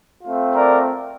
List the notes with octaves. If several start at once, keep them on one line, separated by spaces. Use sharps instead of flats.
A3 C4 F4
A#4 D5